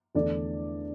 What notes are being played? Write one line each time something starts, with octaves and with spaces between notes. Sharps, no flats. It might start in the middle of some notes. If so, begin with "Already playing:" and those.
E2 D3 A3 D4 D5